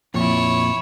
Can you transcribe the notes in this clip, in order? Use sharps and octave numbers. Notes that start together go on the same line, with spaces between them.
F2 A#2 E4 C#5